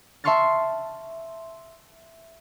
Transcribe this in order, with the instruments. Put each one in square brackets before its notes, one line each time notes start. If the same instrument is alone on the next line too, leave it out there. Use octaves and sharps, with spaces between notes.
[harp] E5 A5 C6 C#6 F6 A6